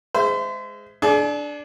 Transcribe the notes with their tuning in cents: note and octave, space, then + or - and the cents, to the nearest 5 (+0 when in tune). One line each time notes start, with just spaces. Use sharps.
G#3 +0 C5 -30 E5 +15
D4 +0 G#4 +45